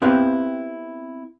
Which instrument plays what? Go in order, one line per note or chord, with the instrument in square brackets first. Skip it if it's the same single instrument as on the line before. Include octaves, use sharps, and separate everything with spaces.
[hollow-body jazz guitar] B3 C4 E4 G4 B4 F5